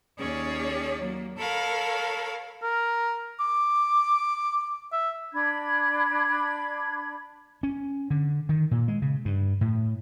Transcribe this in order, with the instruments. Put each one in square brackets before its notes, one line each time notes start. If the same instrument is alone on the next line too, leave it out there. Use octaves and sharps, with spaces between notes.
[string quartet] D#2 C#4 G#4 C#5 D5
F#3 A#3
A4 A#4 C#5 F5 B5
[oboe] A#4
D6
E5
[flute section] D4 B5 G#6
[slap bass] C#4
D3
D#3
A#2
G#3
C#3
G2
A2